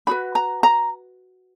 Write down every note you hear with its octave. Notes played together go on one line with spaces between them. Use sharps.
D4 F#4 B4 B5
A#5
A#5